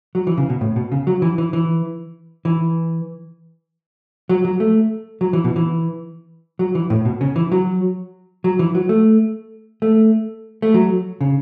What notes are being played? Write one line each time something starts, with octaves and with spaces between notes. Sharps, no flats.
F#3
E3
C#3
B2
A2
B2
C#3
F#3
E3
E3
E3
E3
F#3
F#3
A3
F#3
E3
B2
E3
F#3
E3
A2
B2
C#3
E3
F#3
F#3
E3
F#3
A3
A3
A3
F#3
C#3